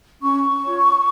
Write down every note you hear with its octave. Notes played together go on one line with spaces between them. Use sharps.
C#4 C#6
F4 C#5